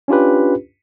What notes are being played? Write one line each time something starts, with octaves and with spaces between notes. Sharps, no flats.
C#4 D4 F4 G4 B4